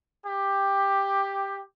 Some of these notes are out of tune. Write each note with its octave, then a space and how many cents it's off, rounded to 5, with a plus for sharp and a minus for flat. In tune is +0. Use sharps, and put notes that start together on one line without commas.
G4 +10